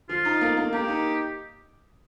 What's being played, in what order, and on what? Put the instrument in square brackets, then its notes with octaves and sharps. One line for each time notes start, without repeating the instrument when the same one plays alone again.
[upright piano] F3 [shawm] F4
[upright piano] D#4
A#3
A#3
[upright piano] A#3 [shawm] G4
[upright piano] D#4